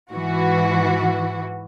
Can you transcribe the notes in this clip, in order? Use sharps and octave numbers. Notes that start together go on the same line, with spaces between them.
G#2 E3 F#4